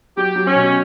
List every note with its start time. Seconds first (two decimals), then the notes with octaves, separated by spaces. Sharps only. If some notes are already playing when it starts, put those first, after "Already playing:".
0.17 F#3 G4
0.36 F#3
0.46 C#4
0.55 B2